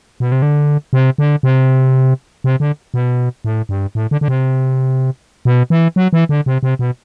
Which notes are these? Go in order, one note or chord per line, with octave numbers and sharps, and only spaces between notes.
B2
C3
D3
C3
D3
C3
C3
D3
B2
A2
G2
A2
D3
D3
C3
B2
E3
F#3
E3
D3
C3
C3
B2